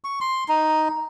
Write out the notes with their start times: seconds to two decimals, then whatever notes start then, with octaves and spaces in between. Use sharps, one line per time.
0.04 C#6
0.21 C6
0.49 D#4